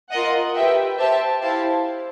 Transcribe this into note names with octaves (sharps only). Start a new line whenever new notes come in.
F4 A#4 D#5 F#5
G4 B4 E5 G5
G4 C5 E5 A5
E4 G4 C5 F5 A5